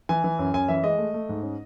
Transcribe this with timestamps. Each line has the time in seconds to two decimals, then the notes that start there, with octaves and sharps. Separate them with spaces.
0.09 E3 G#5
0.24 E3
0.39 F#2
0.54 F#2 G#5
0.68 E3 E5
0.83 G#3 D#5
0.98 A3
1.14 A3
1.29 G#2
1.43 C#4